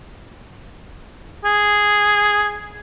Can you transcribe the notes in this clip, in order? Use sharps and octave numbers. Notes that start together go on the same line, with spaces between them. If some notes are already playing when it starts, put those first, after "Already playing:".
G#4